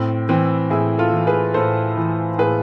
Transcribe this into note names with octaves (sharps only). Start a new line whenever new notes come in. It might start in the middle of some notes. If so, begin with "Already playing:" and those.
Already playing: A2 C4
E3 C4
A2 E4 G#4
F4 A4
E3
G#4 B4
A2 A4 C5
E3
A2 G#4 B4